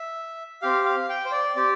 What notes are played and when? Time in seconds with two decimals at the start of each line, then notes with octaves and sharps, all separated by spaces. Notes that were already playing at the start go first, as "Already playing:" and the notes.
Already playing: E5
0.62 C4 G4 F5
0.85 F5
1.09 G5
1.25 C5
1.32 D5
1.55 C4 G4 D5